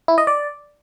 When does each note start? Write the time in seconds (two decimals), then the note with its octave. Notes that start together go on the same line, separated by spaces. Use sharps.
0.08 E4
0.18 D#5
0.27 D5